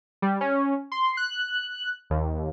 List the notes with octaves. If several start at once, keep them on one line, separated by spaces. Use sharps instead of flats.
G3
C#4
C6
F#6
D#2